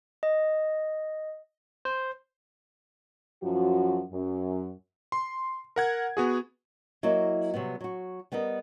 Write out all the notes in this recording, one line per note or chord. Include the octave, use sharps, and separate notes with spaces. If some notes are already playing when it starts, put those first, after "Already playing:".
D#5
C5
F#2 F3 F#4
F#2
C6
A#4 F#5 G#6
B3 F#4 G#4
F#3 A#3 E4 F#4 D#5 E5
C3 F#3 G3 B3
F#3 F#4
G3 B3 A#4 D#5